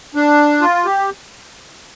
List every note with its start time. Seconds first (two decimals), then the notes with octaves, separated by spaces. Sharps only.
0.15 D4
0.61 F4
0.85 G4